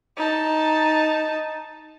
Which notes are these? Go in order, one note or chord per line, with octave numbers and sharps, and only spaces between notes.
D#4 A5